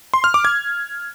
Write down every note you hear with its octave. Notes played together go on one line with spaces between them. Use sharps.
C6
F6
D6
G#6